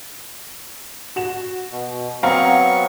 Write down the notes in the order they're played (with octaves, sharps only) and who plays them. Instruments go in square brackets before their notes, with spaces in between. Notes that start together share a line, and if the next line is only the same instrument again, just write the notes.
[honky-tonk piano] F#4 E7
[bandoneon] B2
[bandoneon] F#3 B3 C#6 [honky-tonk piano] C4 F5 A#5